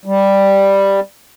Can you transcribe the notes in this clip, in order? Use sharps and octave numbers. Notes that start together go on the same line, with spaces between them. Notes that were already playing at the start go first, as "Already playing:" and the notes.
G3